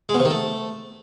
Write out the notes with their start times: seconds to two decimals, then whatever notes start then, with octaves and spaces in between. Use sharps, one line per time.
0.09 G#3
0.14 B2
0.20 C3
0.25 D#3
0.30 A3